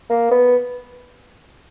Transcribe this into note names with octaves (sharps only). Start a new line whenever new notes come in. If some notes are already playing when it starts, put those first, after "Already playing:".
A#3
B3